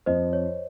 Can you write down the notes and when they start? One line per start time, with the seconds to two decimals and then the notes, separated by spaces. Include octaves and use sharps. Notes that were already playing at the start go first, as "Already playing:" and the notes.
0.06 F2 C5 D#5
0.33 C#5